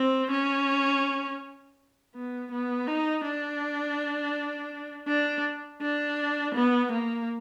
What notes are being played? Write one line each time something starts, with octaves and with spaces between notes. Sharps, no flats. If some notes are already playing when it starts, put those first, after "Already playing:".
Already playing: C4
C#4
B3
B3
D#4
D4
D4
D4
B3
A#3